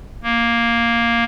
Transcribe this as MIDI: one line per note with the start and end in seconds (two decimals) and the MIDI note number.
0.23 1.24 58